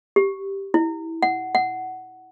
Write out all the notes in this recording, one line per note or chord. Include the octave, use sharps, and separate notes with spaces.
G4
E4
F#5
F#5